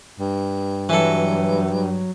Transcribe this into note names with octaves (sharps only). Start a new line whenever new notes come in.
G2
E3 F#3 A4